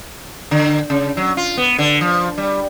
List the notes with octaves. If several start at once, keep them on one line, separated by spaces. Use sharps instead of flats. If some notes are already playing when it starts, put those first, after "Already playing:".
D3
C#3
F#3
F4
B3
D3
F3
G3